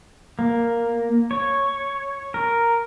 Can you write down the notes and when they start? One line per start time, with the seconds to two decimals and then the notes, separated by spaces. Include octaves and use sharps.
0.39 A#3
1.31 C#5
2.34 A#4